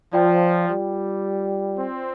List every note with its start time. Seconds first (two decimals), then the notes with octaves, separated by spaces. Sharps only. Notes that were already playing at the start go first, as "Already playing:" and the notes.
0.13 F3 F4 D5 G5
0.68 G3
1.78 C4